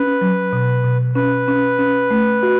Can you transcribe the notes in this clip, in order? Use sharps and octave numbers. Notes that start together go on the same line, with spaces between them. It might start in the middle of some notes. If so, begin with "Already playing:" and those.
Already playing: C#4 B4
F#3
B2
B2
C#4 B4
C#4
C#4
A3
F#4